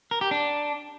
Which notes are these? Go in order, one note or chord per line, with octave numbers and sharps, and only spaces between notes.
A#4
G4
D4